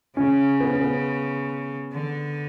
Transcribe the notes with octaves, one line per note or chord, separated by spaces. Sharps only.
C#3 C#4
B3
C#4
B3
D3